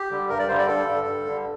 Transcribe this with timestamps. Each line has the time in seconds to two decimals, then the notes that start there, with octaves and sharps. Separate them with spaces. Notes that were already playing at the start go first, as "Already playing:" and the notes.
Already playing: G4
0.10 D3 G3
0.29 G2 A#4
0.39 D5
0.48 D3 G3 C5
0.58 D5
0.68 G2 A4
0.87 D3 G3
1.07 G2
1.26 D3 G3